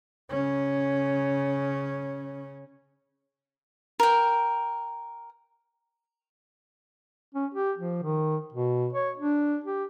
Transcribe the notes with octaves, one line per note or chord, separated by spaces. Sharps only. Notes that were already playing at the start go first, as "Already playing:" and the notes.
C#3 C#4
A#4 G5
C#4
G4
F3
D#3
B2
C#5
D4
G4